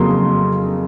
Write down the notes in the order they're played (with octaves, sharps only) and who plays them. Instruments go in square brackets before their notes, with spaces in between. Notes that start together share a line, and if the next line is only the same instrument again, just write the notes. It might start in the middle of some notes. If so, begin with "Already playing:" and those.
Already playing: [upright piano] F2 C#3 F#3 A#3 C6